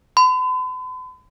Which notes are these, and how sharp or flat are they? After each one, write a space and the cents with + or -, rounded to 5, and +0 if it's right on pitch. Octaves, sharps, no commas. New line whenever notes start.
B5 +45